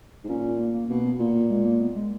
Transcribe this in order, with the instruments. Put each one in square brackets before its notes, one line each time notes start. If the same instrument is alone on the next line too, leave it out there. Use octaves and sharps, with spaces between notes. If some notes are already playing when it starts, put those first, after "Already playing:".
[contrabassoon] G#2
[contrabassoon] A#2 [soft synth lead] C#4
[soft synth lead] A#3
A#3
[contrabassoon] B2 [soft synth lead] A#3
[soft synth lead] B3
[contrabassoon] A#2 [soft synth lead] A#3
[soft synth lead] A#3
G#3
A#3
B3
G#3